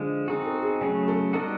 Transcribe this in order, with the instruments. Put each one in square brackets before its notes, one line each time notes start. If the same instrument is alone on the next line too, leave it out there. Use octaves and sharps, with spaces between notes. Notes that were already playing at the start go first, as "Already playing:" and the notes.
Already playing: [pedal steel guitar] D3 F3 G#3
[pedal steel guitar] C4 D#4 F#4 [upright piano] G#4
[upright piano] A4
G#4
[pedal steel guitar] C#3 F#3 A3 [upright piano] G#4
[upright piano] A4
[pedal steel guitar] G3 B3 D#4 F#4 [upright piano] A4